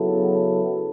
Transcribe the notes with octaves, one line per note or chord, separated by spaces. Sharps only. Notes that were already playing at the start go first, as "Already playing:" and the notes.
Already playing: C#3 F#3 B3 E4 A4